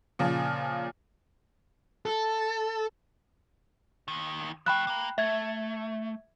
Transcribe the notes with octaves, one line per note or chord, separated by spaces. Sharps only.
A#2 C#3 F3
A4
D#2 D#3
F3 A3 G5 B5 F#6
A#3 A#5
A3 E5 G#6